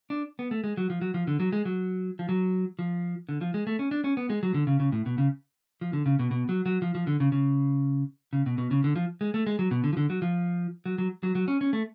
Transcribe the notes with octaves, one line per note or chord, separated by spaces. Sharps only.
D4
B3
A3
G#3
F#3
F3
F#3
F3
D3
F#3
G#3
F#3
F3
F#3
F3
D3
F3
G#3
A3
C#4
D4
C#4
B3
G#3
F#3
D3
C#3
C#3
A2
B2
C#3
F3
D3
C#3
B2
B2
F#3
F#3
F3
F3
D3
C#3
C#3
C#3
B2
B2
C#3
D3
F3
G#3
A3
G#3
F#3
B2
D3
F3
D3
F#3
F3
F#3
F#3
F#3
F#3
C#4
C#4
A3